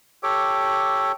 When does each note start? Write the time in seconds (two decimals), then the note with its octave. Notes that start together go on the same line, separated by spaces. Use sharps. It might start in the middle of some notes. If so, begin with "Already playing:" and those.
0.23 G4 A4 C#5 D6